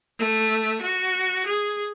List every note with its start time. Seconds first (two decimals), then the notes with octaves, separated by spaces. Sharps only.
0.19 A3
0.82 F#4
1.46 G#4